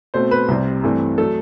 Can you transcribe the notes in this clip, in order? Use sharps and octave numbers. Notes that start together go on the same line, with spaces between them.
B2 A3 C4 C5
B4
C2 C3 G3 C4
G2 E3 A3 C4
F#3 A3 A4